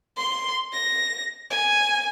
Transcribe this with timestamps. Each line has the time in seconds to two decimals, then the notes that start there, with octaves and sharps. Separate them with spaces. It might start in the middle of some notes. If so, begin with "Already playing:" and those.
0.17 C6
0.73 A#6
1.50 G#5